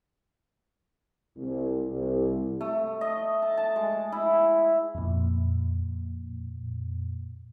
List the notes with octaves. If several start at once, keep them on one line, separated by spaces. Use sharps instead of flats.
C2
C2
A3
D#5
A5
A5
G#3
E4
F2 A#2